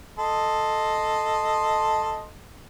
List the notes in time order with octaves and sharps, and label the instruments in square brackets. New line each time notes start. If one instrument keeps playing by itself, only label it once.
[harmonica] A4 D#5 C6